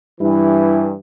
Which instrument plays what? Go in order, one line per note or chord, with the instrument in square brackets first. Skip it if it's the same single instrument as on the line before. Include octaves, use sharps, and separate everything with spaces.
[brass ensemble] G2 E3 [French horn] E4